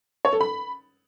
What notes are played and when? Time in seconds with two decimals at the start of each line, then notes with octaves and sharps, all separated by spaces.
0.25 C#5
0.33 A4
0.41 B5